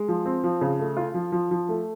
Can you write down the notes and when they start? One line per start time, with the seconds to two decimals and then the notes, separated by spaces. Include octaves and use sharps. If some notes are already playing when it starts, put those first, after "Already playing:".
Already playing: G#3
0.08 F3
0.25 C4
0.44 F3
0.61 C#3
0.80 A3
0.97 F4
1.14 F3
1.32 F3
1.51 F3
1.69 A3